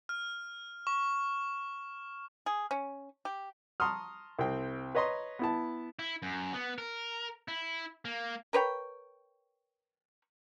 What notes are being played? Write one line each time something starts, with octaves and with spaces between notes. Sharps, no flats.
F6
C#6
G#4
C#4
G4
A5 A#5 C6 C#6 D#6 F6
C2 C4 G5
B4 C#5 D#5 A#5 C6
B3 E4 A5
E4
F#2
B3
A#4
E4
A#3
A#4 B4 C#5 G5